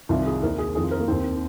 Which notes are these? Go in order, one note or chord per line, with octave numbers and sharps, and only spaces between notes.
C2 C3 D#3 F4
G#4
D#2 D#3 A#4
G#4
F2 D#3 G#4
F4
A#4
A#3
D#2 D#3 C4